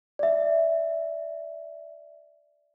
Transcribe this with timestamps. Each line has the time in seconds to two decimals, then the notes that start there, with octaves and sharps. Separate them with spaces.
0.19 D5 E5